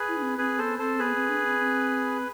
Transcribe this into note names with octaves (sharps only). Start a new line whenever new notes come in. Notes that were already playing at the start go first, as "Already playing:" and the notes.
Already playing: G#4 B4
E4
D4
C4
C4 G#4 B4
B3 A4 C5
C4 A4 C5
B3 G#4 B4
C4
D4
C4
C4